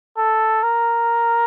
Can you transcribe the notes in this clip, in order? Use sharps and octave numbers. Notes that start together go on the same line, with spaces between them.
A4
A#4